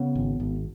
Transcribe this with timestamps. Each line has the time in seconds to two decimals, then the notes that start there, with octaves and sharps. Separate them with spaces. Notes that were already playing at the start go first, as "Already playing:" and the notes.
Already playing: C#3 B3
0.15 G#1
0.40 G#1